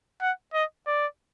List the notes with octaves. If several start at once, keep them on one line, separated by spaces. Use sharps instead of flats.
F#5
D#5
D5